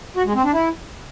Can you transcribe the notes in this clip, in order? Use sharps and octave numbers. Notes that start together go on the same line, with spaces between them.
F#4
G#3
C4
D4
E4